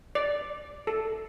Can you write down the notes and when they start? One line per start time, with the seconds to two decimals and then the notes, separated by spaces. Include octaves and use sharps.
0.15 D5
0.87 A4